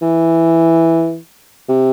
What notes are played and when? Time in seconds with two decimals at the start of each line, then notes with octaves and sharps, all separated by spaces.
0.02 E3
1.69 C3